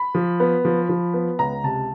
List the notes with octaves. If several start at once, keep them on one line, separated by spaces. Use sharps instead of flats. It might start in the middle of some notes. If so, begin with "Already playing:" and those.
Already playing: B5
F3
B3
F3
F3
B3
C#2 A#5
C3 A5